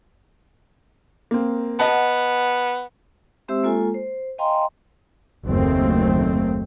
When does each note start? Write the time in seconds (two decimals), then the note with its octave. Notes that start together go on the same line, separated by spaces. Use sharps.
1.31 A#3 C4
1.79 B3 D#5 F#5 A5
3.48 G#3 C4 G4 C5 E5 E6
3.63 G#3 A#3 F4 A4 G#5
3.94 C5
4.38 D#5 F5 G5 G#5 A#5 C6
5.45 F#1 D#2 D#3 A3 C4